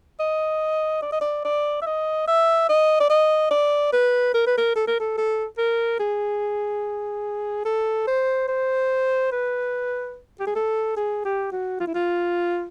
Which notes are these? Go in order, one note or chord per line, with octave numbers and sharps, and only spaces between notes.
D#5
D5
D#5
D5
D5
E5
D#5
E5
D#5
D5
D#5
D5
B4
A#4
B4
A#4
A4
A#4
A4
A4
A#4
G#4
A4
C5
C5
B4
G4
G#4
A4
G#4
G4
F#4
F4
E4
F4